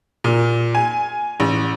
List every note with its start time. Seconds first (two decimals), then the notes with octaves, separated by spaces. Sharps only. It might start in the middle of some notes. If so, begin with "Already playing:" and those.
0.24 A#2
0.75 G#5
1.40 A1